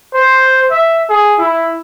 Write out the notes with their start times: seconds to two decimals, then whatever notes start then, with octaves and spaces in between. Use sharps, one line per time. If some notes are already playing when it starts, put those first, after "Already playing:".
0.14 C5
0.71 E5
1.10 G#4
1.39 E4